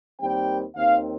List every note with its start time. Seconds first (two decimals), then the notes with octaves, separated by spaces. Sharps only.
0.19 D#2 D#3 G3 C4 G5
0.75 D#2 D#3 C4 F5